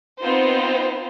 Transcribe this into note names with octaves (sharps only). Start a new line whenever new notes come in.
B3 C4 D#4 F4 C5